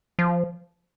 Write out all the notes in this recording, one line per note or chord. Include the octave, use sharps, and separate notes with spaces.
F3